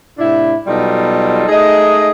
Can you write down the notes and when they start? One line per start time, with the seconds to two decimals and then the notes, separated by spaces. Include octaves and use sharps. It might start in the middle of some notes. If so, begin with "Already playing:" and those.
0.19 A2 C3 D4 E4
0.67 B2 F#3 G3 D#4 F4 A4
1.48 A3 D#4 G#4 D#5